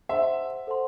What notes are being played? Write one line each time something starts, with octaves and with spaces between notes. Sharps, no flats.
G#4 C5 E5 F#5 A5 C6
A4 C5 F#5 A5 C6